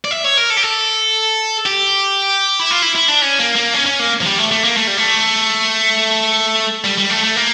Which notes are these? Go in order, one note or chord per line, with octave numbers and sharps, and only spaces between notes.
D5
E5
C#5
A#4
A4
G4
A4
G4
E4
F4
E4
E4
D4
C#4
A#3
A#3
C#4
C#4
A#3
F3
G3
A3
A3
A#3
A3
G3
A3
G3
G3
A3
A3
A#3